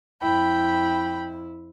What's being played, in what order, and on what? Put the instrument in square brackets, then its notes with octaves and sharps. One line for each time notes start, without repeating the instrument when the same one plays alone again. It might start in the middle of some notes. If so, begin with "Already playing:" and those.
[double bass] F2 E4 [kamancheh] G5 B5